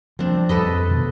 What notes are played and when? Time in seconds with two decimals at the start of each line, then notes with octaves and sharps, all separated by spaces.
0.19 F3 G3 C4 D4
0.49 F2 A4 B4 D#5
0.89 B2 D#3